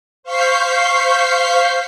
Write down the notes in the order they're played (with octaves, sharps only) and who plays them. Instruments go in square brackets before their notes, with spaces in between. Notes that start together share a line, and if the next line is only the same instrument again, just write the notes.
[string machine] C5 F5 C#6 G6 B6 C7